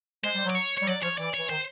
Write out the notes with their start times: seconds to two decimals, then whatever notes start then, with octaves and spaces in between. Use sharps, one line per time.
0.24 G#3 C5
0.35 G3
0.45 F#3
0.50 D5
0.55 C#5
0.78 G3 C#5
0.87 F#3 D5
1.03 F3 C#5
1.18 E3 D5
1.34 E3 C#5
1.49 D#3 C5